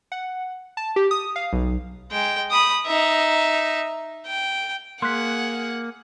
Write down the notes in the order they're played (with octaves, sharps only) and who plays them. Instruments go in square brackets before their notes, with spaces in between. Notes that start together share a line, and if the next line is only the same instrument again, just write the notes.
[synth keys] F#5
A5
G4
D#6
F5
B1
[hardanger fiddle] G#3 G5
B5 D#6
D#4 E5
G5
[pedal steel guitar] A#3 [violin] G#4 F#5 [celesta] C6 F#6 B6